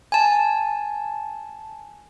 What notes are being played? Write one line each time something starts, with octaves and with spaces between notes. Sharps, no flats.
G#5 A5